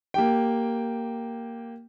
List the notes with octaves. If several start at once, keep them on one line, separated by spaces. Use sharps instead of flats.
A#3 G4 G5